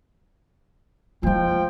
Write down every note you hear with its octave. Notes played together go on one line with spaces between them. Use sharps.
F3 G#3 A#3 G5